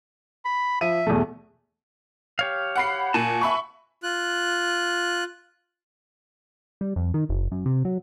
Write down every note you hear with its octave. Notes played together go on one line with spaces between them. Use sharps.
B5
F3 E5 D#7
E2 B2 A3
G4 C#5 F5
F#5 B5 C7
A#2 F#4 G#5 A5
E5 B5 C#6
F4 F#6
G3
F2
D#3
F#1
F#2
C3
F#3